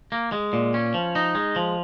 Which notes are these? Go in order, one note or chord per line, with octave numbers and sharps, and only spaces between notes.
A#3
G#3
A#2
C#4
F3
D#4
G#3
F3